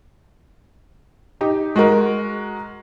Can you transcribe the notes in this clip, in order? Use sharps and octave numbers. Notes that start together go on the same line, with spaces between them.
D#4 G4
G#3 F#4 A#4